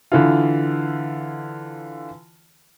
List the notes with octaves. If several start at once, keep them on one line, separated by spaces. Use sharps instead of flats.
D3 E3 F4